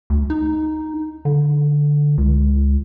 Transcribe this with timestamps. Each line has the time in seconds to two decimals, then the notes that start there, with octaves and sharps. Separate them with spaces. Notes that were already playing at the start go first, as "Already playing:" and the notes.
0.10 D2
0.30 D#4
1.25 D3
2.18 C#2